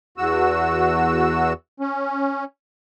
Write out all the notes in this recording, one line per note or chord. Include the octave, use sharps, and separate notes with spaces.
E2 F#4 E6
C#4